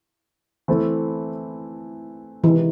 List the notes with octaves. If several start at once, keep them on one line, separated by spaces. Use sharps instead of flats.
E3 A3 C4 E4 A4
C3 D#3 E3 G#3